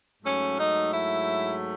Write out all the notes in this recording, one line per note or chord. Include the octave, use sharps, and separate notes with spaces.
G#2 F#3 A3 C#4
D#4
E4